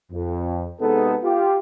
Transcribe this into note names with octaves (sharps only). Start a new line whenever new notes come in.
F2
C3 G#3 B3 D#4 A4
F4 G4